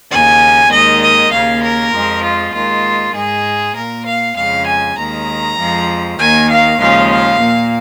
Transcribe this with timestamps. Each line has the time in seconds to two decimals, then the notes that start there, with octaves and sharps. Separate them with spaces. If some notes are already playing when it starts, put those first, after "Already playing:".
0.10 D#2 C#3 A#3 G#5
0.71 D#2 D#3 G#3 D#5
1.02 D#5
1.32 D#2 C#3 A#3 F5
1.63 A#4
1.93 F2 F3 G#3
2.23 F4
2.54 D#2 D#3 G#3 F4
3.15 G#2 G#3 G#4
3.75 A#2 A#3 A#4
4.06 F5
4.36 F2 C#3 G#3 F5
4.67 G#5
4.97 D#2 D#3 G#3 A#5
5.58 F2 F3 G#3
6.19 D#2 D#3 A#3 G#5
6.49 F5
6.79 D#2 C#3 F3 G#3 F5
7.10 F5
7.40 A#2 A#3